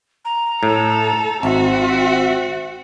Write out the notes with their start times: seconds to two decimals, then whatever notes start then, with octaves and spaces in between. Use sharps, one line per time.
0.25 A#5
0.63 A2 A4
1.43 G#1 C4 F#4 E5